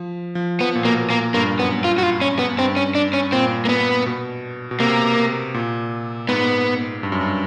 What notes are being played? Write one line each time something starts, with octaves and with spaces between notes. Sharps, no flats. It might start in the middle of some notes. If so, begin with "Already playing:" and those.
Already playing: F3
F3
F3 B3
A#2
B2 A#3
A#2 A#3
G2 A#3
F#2 B3
F4
F#4
F4
C#4
B3
G2 C4
C#4
D4
C#4
A#2 C4
A#3
B3
B2
B2
C3 A#3
A#2
G#2 B3
G2
F#2
G2